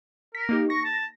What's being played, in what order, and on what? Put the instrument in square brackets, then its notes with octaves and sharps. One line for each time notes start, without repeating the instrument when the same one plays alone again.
[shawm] A#4 [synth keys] B6
[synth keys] A#3 D#4 G4
[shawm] C#6 [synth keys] A#6
[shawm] A5